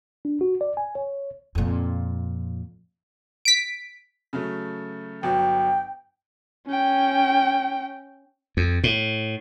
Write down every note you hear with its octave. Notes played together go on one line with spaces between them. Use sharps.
D4
F#4
D5
G#5
C#5
F2 A#2
B6 D7
C#3 F#3 A3
G1 F#3 G5
C#4 G5
F2
A2